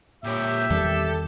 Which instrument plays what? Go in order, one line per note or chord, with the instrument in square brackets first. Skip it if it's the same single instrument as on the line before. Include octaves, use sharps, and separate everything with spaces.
[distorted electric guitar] A#2 C#5 [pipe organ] G4 G6 [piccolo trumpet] E5
[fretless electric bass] E2 D#3 G3 [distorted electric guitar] A4